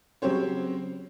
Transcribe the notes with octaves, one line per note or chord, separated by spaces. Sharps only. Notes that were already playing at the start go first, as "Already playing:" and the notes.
C#3 F#3 C4 G4 C5 C#5